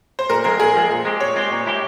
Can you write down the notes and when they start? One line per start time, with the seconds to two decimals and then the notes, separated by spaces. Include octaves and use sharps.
0.19 C5
0.30 A#2 A#4
0.44 F3 G#3 C4 A#4
0.60 A#2 G#4
0.75 F3 G#3 C4
0.91 A#2
1.05 G#3 C4 G4
1.20 A#2 C#5
1.36 G#3 C4 G4
1.51 A#2
1.66 G#3 E4 G4